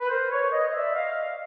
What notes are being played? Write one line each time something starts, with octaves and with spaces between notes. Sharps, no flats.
B4
A#4 C5
B4 C#5
C#5 D#5
D#5
D5 E5
D#5 F5